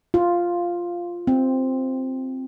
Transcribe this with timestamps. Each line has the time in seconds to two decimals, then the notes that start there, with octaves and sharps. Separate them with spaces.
0.14 F4
1.27 C4